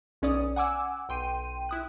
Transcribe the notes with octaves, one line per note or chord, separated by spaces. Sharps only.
B1 C#4 D5 D#6
F#5 G#5 D6 E6
B1 G5 C6 D#7
E4 D#6 F#6